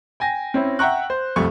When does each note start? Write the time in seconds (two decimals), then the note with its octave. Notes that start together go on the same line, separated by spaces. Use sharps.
0.20 G5 G#5 A#6
0.54 C4 C#4 E4
0.79 E5 F#5 G5 A#5 C#6 F#6
1.10 C5
1.36 C2 F2 A3 C#6